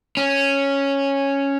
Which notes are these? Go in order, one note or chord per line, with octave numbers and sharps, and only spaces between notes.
C#4